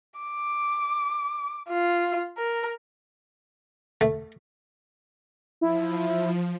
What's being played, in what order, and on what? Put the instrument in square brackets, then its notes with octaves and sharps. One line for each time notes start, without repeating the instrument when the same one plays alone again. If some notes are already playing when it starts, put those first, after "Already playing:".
[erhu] D6
F4
A#4
[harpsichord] A3
[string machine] F3 [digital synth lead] E4